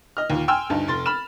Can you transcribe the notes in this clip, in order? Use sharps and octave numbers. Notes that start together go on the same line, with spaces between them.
D#5 F6
D#2 A#2
G5 G#5 C6 E6 F6
D2 G2 D#4 A5
F1 C6 A6
B5 F6 E7